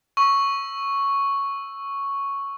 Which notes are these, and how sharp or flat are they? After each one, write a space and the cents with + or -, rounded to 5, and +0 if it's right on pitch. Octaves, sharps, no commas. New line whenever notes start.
C#6 +0 E6 +0